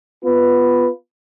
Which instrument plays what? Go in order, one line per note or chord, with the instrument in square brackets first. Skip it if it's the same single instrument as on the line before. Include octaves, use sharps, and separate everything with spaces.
[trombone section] B3 F4 B4